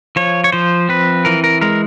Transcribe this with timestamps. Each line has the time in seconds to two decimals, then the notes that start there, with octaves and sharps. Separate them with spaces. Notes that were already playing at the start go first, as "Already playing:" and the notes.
0.16 F3 C#5
0.44 C#5
0.52 F3 C5
0.89 C4 B4
1.25 E3 A#4
1.44 A#4
1.62 G#3 A#4